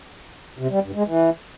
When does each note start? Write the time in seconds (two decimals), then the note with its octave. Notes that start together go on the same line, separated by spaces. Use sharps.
0.59 C3
0.71 G3
0.82 G2
0.94 G#3
1.06 E3